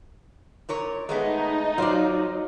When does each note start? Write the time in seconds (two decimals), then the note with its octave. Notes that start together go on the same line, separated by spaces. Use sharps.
0.69 A#2 A#4 C#5
1.09 G#3 A3 B3 D#4
1.78 F#3 F4 C5 D5